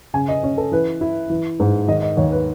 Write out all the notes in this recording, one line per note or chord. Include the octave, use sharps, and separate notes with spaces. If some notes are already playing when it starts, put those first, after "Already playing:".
C#3 G#5
D#5
C#4 C#5
A4
E3 B4
E4
E3
G#2
D#3 D#5
D#5
D#2 C#5
B4